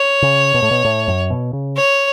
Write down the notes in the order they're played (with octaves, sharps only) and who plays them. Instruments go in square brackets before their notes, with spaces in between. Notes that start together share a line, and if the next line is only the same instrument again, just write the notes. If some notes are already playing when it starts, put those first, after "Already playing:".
Already playing: [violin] C#5
[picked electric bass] C#3
B2
A2
B2
A2
F#2
B2
C#3
[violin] C#5